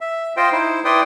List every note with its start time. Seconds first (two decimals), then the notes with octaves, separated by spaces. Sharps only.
0.01 E5
0.37 F4 C5 D#5 G5
0.52 D#4 E4 C5
0.85 E4 B4 D5 G5 C6 D#6